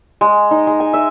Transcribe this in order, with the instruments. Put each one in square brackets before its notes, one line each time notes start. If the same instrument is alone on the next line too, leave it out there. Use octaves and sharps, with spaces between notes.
[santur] G#3
D#4
G#3
G#5
E5